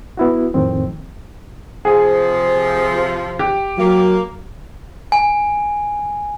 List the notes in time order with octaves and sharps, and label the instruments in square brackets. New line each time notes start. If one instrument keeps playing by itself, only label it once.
[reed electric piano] B3 E4 F#4
F2 A2 D#3 C4
[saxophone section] C3 F3 [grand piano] G#4
[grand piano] G4
[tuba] F#3 [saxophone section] A#3
[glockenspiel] G#5